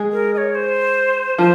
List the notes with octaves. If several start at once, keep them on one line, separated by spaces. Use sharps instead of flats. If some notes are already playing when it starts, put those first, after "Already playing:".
Already playing: G#3 G#4
A#4
D#5
C#5
C5
F3 F4 C5